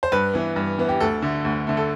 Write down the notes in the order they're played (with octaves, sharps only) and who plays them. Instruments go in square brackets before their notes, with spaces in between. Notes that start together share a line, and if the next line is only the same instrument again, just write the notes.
[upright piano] C5
G2 B4
E3 B3
G2
E3 B3
G4
D2 A4
D3 A3
D2
D3 A3
A4